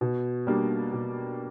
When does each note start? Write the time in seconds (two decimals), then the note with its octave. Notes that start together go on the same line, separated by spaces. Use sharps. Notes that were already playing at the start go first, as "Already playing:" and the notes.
0.01 B2
0.47 G3 A#3 D4
0.93 B2